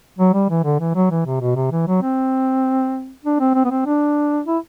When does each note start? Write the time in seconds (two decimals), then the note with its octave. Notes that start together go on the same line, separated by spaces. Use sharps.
0.18 F#3
0.33 G3
0.50 E3
0.64 D3
0.80 E3
0.95 F#3
1.11 E3
1.26 C3
1.41 B2
1.55 C3
1.72 E3
1.87 F#3
2.02 C4
3.24 D4
3.40 C4
3.55 C4
3.65 B3
3.70 C4
3.86 D4
4.47 E4